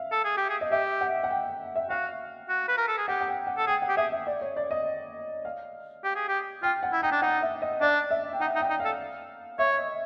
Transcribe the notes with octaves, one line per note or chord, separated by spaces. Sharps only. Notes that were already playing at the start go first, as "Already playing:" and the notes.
Already playing: E5 F5
A4
G#4
G4
G#4
D#5
G4 E5
F#5
F#5
G5
E5
F#4 F5
F#4
B4
A#4
A4
G#4
G4 F#5
F#5
G5
F#5
A4
G#4 G5
F#5
G4
G#4 E5
E5
D5
C#5
D5
D#5
F5
G4
G#4
G4
F4 G5
F#5
E4
D#4 G5
D4
D#4 F#5
E5
D#5
D4 D5
E5
G5
D#4 F#5
D#4
G5
D#4
F5
A4
C#5 E5
D#5